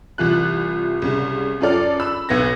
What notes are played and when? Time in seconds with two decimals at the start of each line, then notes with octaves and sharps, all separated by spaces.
0.18 C2 E3 F4 F#6
1.02 C2 C#3
1.61 F#2 F4 A4 D5 F6
2.00 B5 E6
2.29 B1 B3 G#6 A#6